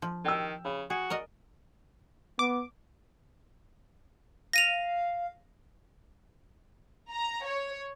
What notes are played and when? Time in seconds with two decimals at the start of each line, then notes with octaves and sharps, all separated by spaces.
0.02 F3
0.25 D#3 G5 E6
0.65 C#3 B5
0.90 F#4 G#4
1.10 A#4 D5 D#5
2.39 B3 D6
4.53 F5 A#6 D#7 F7
7.11 A#5
7.45 C#5